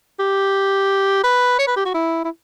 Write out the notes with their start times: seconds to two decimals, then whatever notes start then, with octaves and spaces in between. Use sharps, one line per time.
0.20 G4
1.24 B4
1.59 C#5
1.68 B4
1.77 G4
1.85 F#4
1.94 E4
2.25 E4